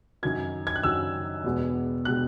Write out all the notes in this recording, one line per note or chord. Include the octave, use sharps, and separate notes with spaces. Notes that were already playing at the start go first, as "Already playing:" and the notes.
F#2 D#3 F#3 G#6
G#6
F#6
F#2 D#3 F#3 E6
E2 B2 G#3
B2 G#3 F#6